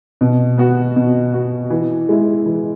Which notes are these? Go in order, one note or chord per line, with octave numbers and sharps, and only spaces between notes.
B2
B3 F#4
B2
B3 F#4
E3
G#3 E4
E3